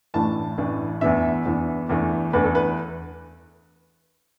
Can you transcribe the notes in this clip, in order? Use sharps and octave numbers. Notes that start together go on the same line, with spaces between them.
A1 A2 E3 D4 A5
A1 A2 E3 D4
E2 E3 B3 D4 E5
E2 E3 B3 D4
E2 E3 A3 D4
E2 E3 A3 D4 B4
A4
B4